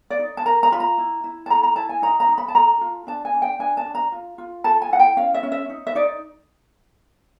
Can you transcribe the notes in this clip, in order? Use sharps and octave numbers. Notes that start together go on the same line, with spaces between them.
D5
D#4
A5
A#4 A#5
A#5
F4 B5
A#5
E4
E4
A5
A4 A#5
A#5
E4 A5
G#5
D#4 A#5
A#5
D#4
B5
A5
A4 A#5
F4
D4 A5
G#5
D4
G5
D4 G#5
A5
D4
A#5
F4
F4
A4 A5
G#5
E4 F#5
G5
C#4 F5
E5
C#4
E5
D#4
E5
D#4 D5